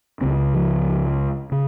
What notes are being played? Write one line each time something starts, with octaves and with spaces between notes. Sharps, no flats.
C#2 C#3 C4
F3
C#3